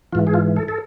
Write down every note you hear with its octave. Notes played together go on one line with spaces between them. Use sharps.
G#2 E3 F4
G#4
F4
A4
A4